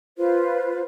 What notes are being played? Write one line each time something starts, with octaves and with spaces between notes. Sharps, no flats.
F4 B4 C5